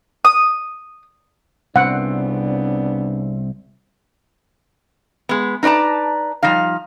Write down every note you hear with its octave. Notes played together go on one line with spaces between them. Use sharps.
D#6
C2 C#3 B3 C4 D4 F#5
G#3 B3
D#4 B4 D5 A5 A#5
F3 G3 D#4 F5